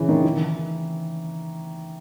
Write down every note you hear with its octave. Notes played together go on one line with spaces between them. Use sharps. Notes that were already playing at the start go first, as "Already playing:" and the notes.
Already playing: C#3 E3
D#3
E3